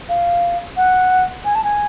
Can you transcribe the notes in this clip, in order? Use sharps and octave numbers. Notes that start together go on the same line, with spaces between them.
F5
F#5
G#5
A5
G#5